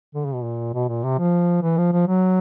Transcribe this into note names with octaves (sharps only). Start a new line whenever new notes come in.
D3
C#3
B2
A#2
B2
A#2
C3
F3
E3
F3
F3
F#3